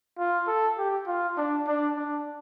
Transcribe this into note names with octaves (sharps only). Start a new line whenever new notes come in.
F4
A4
G4
F4
D4
D4
D4